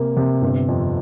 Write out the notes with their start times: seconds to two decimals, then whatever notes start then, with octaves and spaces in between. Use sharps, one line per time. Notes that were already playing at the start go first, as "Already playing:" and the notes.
Already playing: C3 A#3
0.16 C3
0.42 G1
0.68 F2